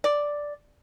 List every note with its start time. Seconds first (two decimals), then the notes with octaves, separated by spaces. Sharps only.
0.04 D5